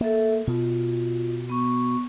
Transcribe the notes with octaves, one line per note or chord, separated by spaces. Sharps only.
A#3 A4 E5
B2 F4
B3 C#6